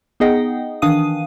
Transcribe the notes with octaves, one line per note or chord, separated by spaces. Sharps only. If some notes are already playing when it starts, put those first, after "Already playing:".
B3 D#4 G#4 D#5 F#5 G5
D#3 E3 D4 F5 D#6 D#7